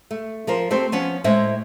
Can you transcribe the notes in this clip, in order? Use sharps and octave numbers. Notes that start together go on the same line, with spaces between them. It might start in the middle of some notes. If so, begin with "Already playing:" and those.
A3
F3 A#4 C5
A3 C4 G4 C5
F3 B3 C#4
A2 G#3 C5 E5